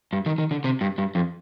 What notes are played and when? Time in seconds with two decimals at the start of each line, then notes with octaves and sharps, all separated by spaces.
0.13 G2
0.26 D#3
0.38 D#3
0.51 D3
0.64 C3
0.81 G2
0.98 G2
1.15 F2